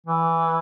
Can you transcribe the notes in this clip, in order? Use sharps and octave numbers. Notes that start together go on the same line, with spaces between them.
E3